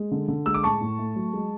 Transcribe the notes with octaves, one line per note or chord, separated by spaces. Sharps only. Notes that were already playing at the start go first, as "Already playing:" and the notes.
Already playing: G#3
D3
D3
G#3 E6
D6
A2 A5 C#6
A2
A3
F#3
G#3